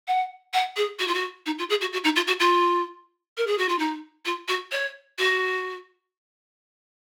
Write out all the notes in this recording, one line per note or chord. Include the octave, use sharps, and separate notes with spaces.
F#5
F#5
G#4
F#4
F4
F#4
D#4
F4
G#4
F#4
F#4
D#4
F4
F#4
F4
A#4
G#4
F#4
F4
D#4
F4
F#4
C#5
F#4